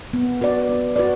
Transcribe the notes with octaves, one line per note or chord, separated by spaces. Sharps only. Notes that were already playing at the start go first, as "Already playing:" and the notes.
B3
F#4 B4 D5
B3
F#4 B4 D5